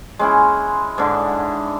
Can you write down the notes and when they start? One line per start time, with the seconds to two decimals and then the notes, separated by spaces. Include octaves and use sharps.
0.19 G#3 C#4 E4
0.98 G#2 D3